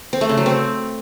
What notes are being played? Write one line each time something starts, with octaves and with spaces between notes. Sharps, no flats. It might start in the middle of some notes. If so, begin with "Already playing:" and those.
C4
A3
C#3
F#3
C4